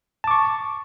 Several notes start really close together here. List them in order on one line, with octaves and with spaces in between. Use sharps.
A5 D6 C#6